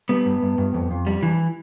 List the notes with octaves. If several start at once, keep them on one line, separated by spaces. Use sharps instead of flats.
G3 B3
G2
G2
G2
F2
F2
G3
E3